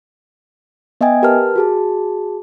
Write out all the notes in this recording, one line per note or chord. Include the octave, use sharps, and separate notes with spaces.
B3 D#5 E5 G5 G#5 G#6
G4 A#4 B4 A5 F6
F#4 G#4 A5